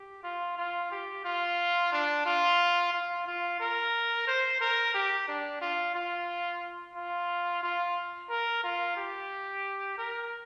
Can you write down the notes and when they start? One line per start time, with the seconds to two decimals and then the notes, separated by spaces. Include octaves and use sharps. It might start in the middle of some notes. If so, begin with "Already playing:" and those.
Already playing: G4
0.24 F4
0.58 F4
0.92 G4
1.25 F4
1.92 D4
2.26 F4
2.94 F4
3.27 F4
3.60 A#4
4.28 C5
4.61 A#4
4.95 G4
5.28 D4
5.62 F4
5.95 F4
6.96 F4
7.63 F4
8.30 A#4
8.64 F4
8.97 G4
9.98 A#4